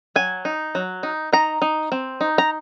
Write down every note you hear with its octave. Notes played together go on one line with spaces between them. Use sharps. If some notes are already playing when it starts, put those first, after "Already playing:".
F#3 G#5
D#4
F#3
D#4
D#4 A#5
D#4
C4
D#4
A#5